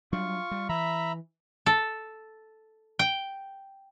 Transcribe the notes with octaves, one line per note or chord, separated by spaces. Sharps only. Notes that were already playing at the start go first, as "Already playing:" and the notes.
F#3 G3 D4 F4 C#6
G3
E3 E5 A#5 B5
A4
G5